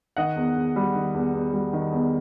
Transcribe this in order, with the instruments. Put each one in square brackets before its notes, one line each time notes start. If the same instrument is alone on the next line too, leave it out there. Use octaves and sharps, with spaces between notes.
[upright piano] D#3 D#5 F#5
E2
E2
G3
D#3
E2
E2
G3
D#3
E2